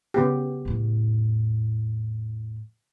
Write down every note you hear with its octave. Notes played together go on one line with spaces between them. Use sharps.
C#3 B3 G4
E2 A2